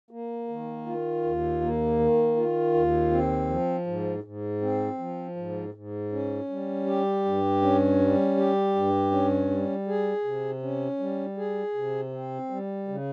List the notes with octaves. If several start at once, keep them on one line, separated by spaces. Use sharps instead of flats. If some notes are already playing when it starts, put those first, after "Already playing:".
A#3
D#3
F4
D#2
A#3
D#3
F4
D#2
C4
F3
G#2
G#2
C4
F3
G#2
G#2
C#4
G3
G4
G2
C#4
G3
G4
G2
C#4
G3
G#4
C3
C#4
G3
G#4
C3
C4
G3
C#3